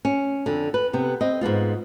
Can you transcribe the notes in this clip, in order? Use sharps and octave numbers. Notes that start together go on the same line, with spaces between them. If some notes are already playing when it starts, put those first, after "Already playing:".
C#4
F2 D3
B4
C3 B3
C4 D#5
G#2 B2 B3 F4